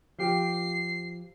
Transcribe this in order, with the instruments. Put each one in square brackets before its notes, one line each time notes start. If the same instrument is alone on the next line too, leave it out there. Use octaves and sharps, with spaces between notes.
[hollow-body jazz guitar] F3 G4 [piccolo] C7